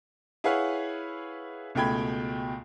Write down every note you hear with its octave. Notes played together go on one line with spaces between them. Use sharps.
E4 G#4 B4 C#5 F5 F#5
C#2 B2 A3 G5 B5 G#6